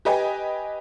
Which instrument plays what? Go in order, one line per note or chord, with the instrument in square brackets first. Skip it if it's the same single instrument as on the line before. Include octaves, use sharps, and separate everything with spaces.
[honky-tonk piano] G4 B4 D#5 G5 G#5